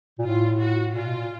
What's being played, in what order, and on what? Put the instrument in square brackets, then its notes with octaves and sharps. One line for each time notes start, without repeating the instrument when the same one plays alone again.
[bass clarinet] A#2
[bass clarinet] A2 [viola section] F4
[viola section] F#4
[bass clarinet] A#2 [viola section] F4
[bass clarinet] B2
A#2